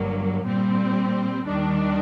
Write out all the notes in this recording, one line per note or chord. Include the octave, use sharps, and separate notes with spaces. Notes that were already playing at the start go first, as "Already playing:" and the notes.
Already playing: G1 G2 F#3 A#3
A#2 G3 C4
D#2 D#3 G3 D4